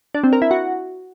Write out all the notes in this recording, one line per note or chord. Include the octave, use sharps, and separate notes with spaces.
D4
C4
A#4
E4
F#4